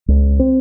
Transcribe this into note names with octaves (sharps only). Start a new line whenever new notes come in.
C#2
C4